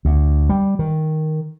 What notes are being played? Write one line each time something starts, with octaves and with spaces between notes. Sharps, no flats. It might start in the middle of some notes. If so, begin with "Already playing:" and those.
D2
G3
D#3